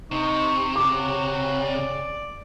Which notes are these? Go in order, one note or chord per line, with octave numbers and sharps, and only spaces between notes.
C3 D#4 C#6
C#3 F#4 D6
D5